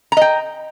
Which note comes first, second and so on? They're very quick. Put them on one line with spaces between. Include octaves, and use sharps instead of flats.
A#5 D#5 G5